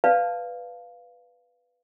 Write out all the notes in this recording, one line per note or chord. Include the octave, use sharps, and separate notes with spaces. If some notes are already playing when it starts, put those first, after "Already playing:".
B4 D5 F5 A5